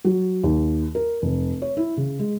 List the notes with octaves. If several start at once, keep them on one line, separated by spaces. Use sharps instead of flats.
F#3
D#2
A#4
F1
C#5
E4
C#3
G#3